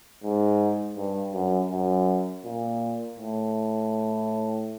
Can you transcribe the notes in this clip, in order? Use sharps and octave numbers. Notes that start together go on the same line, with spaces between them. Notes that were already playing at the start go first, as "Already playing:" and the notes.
G#2
G2
F#2
F#2
A#2
A2